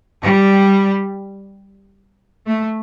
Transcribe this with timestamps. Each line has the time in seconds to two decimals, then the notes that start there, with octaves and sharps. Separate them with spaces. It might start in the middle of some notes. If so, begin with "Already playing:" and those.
0.22 G3
2.46 A3